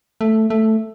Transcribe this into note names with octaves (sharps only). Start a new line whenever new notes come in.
A3
A3